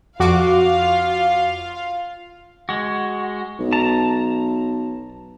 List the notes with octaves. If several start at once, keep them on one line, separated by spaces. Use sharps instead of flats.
F2 F4 F#4 F5 D6
G#3 F#4
B1
A5 A#5